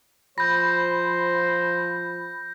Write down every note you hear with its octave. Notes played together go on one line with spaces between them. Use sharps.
F3 C5 B5 G6 A#6